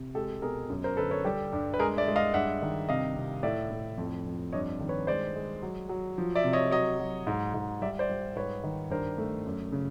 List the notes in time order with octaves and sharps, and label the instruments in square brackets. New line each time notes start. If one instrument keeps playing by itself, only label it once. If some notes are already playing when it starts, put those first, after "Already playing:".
Already playing: [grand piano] C3
G#3 G4 A4
B2 G#4 A#4
F#2
A#4 C5
D3 A4 B4
B4 C#5
G3 G4 A4
G2
B4
G#3 G#4 A#4
D5 E5
G#3
D#5 F5
G2 E5 F#5
D#3
C3 D#5 F5
C3
A2 D5 E5
A2
F2
F2
G2 C#5 D#5
D#3
B4 C#5
G#3 C5 D5
G#3
F#3
F#3
F3
D5 E5
C3
C#5 D#5
F#3 C#5 D#5
F#3
G#2
G#2
G3 D5 E5
C5 D5
G3
G#2 B4 C#5
D#3
G2 A#4 C5
A3
F#2
C#3